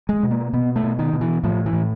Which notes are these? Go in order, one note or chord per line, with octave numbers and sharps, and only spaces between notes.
G#3
B2
A#3
B2 B3
A3
B2
D#3
B2
E3
A2 F3
E3
A2